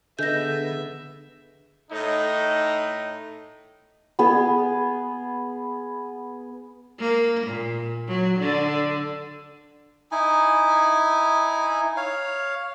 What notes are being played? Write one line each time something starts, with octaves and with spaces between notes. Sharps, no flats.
D3 B3 G#4 A4 D#5 E5 G6 A#6
A2 D#4
B3 G#4
A#3
A#2
F#3
D3
D#4 E4 G#5
C#5 F5